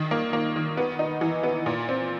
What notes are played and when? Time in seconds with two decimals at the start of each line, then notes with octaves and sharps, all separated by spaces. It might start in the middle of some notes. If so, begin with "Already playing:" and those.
Already playing: D#3
0.11 A#3
0.33 A#3
0.56 D#3
0.77 B3
0.99 D#4
1.21 E3
1.43 B3
1.66 A#2
1.89 C4